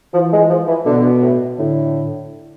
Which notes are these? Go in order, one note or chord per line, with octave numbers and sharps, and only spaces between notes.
E3 F3
G#3
F3
E3
B2 D3
A2
A2 D3